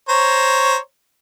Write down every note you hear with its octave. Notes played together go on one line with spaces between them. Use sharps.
C5 C#5 A#5